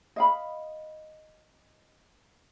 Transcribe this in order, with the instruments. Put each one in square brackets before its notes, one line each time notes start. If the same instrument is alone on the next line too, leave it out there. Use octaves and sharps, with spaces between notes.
[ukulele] D#5 F5 B5